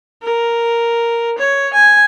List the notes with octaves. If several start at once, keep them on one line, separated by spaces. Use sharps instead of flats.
A#4
C#5
G#5